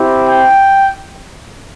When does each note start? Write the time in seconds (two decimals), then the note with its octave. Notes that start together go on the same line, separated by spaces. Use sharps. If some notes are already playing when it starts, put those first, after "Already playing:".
Already playing: C4 E4 G4
0.27 G5